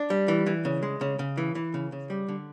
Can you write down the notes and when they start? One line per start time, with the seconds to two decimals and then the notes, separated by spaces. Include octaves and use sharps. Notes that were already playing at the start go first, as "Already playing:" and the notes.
Already playing: D4
0.10 G3
0.28 E3
0.46 E3
0.65 C#3
0.83 G#3
1.01 C#3
1.19 C#3
1.37 E3
1.55 E3
1.74 C#3
1.92 C#3
2.10 G3
2.28 D3